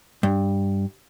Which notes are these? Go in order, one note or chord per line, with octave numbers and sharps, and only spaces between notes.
G2